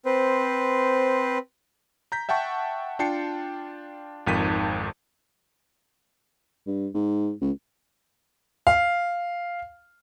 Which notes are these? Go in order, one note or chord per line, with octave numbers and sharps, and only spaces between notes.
C4 B4 C5
A#5 G6 B6
E5 F#5 G5 A5 C#6
D4 F4 G5 A5 C7 C#7
G#1 F2 D#3 B6 D#7
G2
G#2
C#2
F5